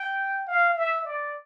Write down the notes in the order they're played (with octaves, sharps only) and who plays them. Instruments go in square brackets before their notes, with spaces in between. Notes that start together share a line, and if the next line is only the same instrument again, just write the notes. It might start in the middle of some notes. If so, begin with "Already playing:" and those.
Already playing: [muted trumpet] G5
F5
E5
D5